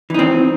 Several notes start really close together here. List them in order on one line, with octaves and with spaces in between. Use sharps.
E3 D#4 C4